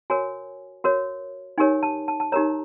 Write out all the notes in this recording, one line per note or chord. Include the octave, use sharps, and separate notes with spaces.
F#4 A#4 C#5 G#5
F#4 A#4 C#5
D#4 G4 A#4 C#5 G#5
A5
A5
A5
D#4 G4 A#4 C#5 A#5